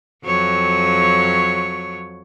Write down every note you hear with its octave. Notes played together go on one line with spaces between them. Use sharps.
F2 F#3 C#5